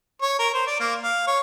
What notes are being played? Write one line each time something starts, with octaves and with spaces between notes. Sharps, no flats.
C#5
A#4
C5
D5
A#3
F5
C#5